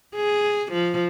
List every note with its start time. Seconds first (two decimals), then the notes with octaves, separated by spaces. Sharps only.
0.16 G#4
0.73 F3